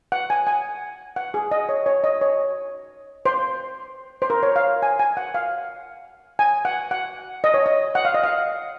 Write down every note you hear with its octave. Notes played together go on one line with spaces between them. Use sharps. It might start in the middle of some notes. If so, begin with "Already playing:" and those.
F#5
G#5
G#5
F#5
G#4
D#5
C#5
C#5
D#5
C#5
C5
C5
A#4
C#5
F5
G#5
G#5
F#5
F5
G#5
F#5
F#5
D#5
C#5
D#5
F#5
F5
D#5
F5